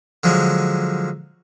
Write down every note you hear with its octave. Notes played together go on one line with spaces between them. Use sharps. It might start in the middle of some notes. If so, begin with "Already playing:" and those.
D3 F3 F#3 G#3